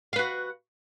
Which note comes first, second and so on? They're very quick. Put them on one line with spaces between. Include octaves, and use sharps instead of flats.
F5 B4 F#4